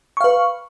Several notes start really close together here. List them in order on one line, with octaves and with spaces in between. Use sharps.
C#6 F5 B4